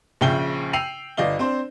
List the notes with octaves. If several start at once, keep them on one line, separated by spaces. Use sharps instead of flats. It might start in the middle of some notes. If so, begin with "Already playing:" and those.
A#1 C#3 E5 G5 G7
G5 E6 C7 D#7 F7 F#7
G1 D5 D#5 F5 G7
C4 D4 C5